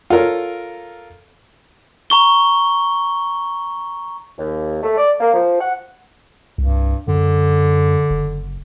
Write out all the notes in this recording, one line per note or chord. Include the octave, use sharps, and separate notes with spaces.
F4 A4 A#4 C#5
A#5 C#6 G7
D#2
A3
D5
A#3
F3
F#5
C2 G2
F#2 D3
F#1